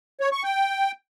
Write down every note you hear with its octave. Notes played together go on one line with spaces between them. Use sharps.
C#5
C#6
G5